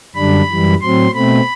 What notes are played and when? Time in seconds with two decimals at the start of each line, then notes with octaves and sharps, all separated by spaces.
0.15 F#2 D3 G3 D4 B5
0.49 F#2 E3 G3
0.81 A2 F#3 C4 C6
1.14 B2 A3 C4 B5